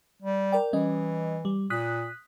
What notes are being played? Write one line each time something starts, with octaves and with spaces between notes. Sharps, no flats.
G3
A#4 D5 G5
E3 G3 C#4 D#5
G3
A#2 D#6 F#6 B6